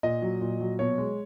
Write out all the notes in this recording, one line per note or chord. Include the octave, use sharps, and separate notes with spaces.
A#2 D#5
F#3
A#2
F#3
B2 C#5
G#3